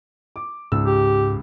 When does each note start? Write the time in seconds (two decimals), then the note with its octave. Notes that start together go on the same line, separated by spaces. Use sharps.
0.36 D6
0.72 C#2 G#2 E6
0.86 G4